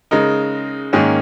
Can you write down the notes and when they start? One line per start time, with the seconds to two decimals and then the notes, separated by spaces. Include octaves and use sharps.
0.11 C#3 G#3 D#4 A#4
0.93 G#2 D#3 A#3 C#4 G#4